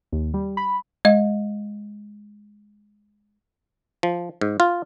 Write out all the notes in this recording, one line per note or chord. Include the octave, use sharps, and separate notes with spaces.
D#2
G3
B5
G#3 D#5
F3
G#2
F4